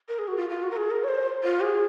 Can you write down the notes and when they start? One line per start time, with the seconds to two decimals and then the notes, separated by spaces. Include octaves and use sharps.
0.09 A#4
0.19 G#4
0.28 F#4
0.37 F4
0.50 F4
0.63 F#4
0.71 A#4
0.77 G#4
0.90 A#4
1.04 C#5
1.08 C5
1.44 F4
1.61 G#4